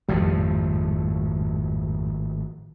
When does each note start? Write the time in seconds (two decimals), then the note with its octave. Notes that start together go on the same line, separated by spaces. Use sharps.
0.09 G#1 F2 A2 F3 G3